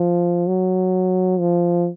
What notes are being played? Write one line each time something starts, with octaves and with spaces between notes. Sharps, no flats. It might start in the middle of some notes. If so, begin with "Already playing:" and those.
Already playing: F3
F#3
F3